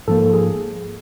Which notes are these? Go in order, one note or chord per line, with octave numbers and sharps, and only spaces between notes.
G#2 F3 A#3 A4
G#4